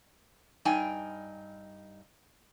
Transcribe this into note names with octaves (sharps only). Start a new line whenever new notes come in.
G2 D#4 G5 G#5